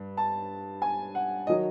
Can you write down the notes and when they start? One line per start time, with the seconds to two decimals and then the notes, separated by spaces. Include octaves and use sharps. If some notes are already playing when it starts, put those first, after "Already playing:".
Already playing: G2
0.17 A5
0.82 G#5
1.15 F#5
1.47 D#3 F#3 D#5